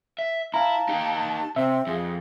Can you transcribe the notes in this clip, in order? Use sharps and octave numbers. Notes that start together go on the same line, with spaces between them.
E5
E4 F5 A5 A#5
D#4 G4
C3 C4 E5
F2 G#4